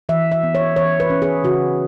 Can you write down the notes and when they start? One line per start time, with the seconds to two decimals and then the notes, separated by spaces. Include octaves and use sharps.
0.09 E3 E5
0.32 E5
0.43 B3
0.55 C#5
0.76 E3 C#5
1.00 B4
1.10 C#4
1.22 G#4
1.44 C#3 F#4